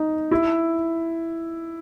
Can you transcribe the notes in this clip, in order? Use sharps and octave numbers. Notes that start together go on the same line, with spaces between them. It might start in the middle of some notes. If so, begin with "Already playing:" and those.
Already playing: D#4
E4